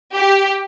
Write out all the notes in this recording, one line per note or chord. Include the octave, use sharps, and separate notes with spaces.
G4